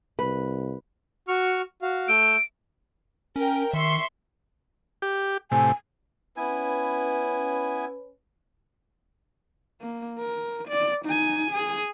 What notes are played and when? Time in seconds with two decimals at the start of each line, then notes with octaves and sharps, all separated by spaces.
0.19 C2 B4
1.28 F#4 C#6 F6
1.82 F#4 F5
2.08 A3 E6 G6 D7
3.36 C#4 A#4 G5
3.73 D#3 E5 C6 C#6
5.02 G4
5.51 A2 C3 G#5
6.37 B3 C#4 E4 B4 G#5
9.81 A#3
10.19 A#4
10.68 D5
11.05 D#4 G#5
11.52 G#4